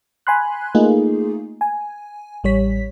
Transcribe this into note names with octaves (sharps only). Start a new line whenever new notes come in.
G#5 B5 C6 F#6
A3 A#3 D#4 F4 G#4
G#5
A1 G3 C#5 B6